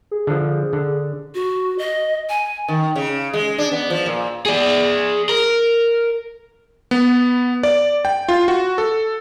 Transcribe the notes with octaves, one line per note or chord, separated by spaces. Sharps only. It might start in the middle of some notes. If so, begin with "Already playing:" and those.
G#4
D3 F3
D3
F#4
D#5
G#5
D#3
C#3
G#3
D4
B3
F3
A#2
G#4 D5
A#4
B3
D5
G5
F4
F#4
A4